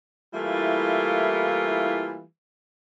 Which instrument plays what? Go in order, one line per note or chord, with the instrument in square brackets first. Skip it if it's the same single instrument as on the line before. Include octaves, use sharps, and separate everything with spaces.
[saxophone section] E3 G3 A3 A#3 E4 F4